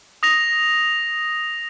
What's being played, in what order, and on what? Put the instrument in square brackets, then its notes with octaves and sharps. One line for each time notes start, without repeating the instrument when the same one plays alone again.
[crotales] D#6 A#6 F7